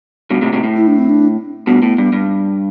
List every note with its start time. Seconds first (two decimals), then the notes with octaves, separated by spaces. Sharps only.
0.30 G2 B2
0.42 A2 C3
0.53 A2 C3
0.64 A2
0.76 E4
0.87 D4
0.99 C4
1.09 D4
1.67 G2 B2 B3
1.82 A2
1.98 G2
2.13 G2